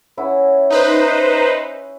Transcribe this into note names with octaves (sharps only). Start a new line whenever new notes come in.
C#4 E4 F#5
D#4 B4 C5